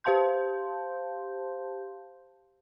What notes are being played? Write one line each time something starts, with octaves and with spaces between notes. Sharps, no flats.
G4 C5 F5 A5 C6 G6